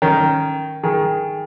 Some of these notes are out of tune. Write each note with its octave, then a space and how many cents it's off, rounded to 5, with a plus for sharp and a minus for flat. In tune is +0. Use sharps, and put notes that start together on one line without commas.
D#3 +0 C#4 +0
D#3 +15 G#4 +0